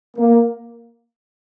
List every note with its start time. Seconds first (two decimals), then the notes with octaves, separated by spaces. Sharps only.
0.17 A#3